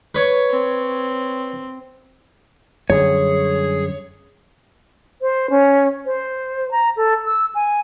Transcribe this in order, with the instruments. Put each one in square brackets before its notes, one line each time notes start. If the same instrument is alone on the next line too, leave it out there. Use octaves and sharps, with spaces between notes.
[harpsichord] B4 C#5
[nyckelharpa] C4
[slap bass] F#2 D3 G3 [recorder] G#4 [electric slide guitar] C#5
[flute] C5
C#4
C5
A#5
A4
E6
G#5